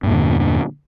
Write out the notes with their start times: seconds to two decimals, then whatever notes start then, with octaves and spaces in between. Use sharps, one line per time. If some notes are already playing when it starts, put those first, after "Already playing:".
0.03 G2
0.07 A#2
0.10 E2
0.14 D3